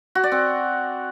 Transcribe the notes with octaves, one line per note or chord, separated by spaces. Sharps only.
F#4
D5
C4